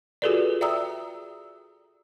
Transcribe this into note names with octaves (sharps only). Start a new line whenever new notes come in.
F4 F#4 G#4 A4 B4 D5
D5 E5 G5 A#5 D#6 E6